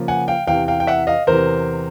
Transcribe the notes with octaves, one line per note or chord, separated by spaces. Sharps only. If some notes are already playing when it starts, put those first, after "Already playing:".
Already playing: C#3 F3 A#3
F#5 G#5
F5 G5
E2 C3 E3 F5 G5
F5 G5
G5
E5 F#5
D#5 F5
E2 C3 E3 A#4 C5